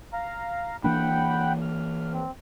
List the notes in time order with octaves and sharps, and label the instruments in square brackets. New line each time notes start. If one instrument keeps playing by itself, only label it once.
[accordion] F5 A#5
[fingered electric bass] E3 A#3 D4 [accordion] F#5 G5 B5
[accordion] F6
C4